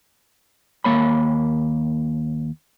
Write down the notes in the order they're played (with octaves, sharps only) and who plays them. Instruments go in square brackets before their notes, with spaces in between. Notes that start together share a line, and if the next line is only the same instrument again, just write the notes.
[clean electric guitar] D#2 A#3 C#5 B5